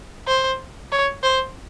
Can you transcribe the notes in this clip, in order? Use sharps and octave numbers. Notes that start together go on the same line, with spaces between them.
C5
C#5
C5